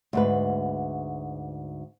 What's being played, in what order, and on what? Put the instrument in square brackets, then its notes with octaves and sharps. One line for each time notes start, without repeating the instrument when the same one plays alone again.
[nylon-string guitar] D2 G#2 B4